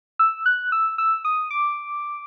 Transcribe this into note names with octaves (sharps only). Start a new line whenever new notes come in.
E6
F#6
E6
E6
D#6
D6